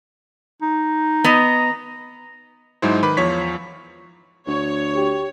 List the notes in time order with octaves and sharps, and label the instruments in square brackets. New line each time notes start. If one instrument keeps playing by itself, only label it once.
[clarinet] D#4
[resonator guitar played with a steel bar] B3 D#5 [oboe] A#5
[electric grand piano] G#2 F#3 G#3 D#4 E4 C5
D#3 B4 B5 D6
E2 F3 C#5 B6
[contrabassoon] D2 [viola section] C#5
[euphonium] G4